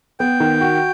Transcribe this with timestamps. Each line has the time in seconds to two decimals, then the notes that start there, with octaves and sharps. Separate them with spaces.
0.20 B3 G5
0.40 D#3
0.61 F#4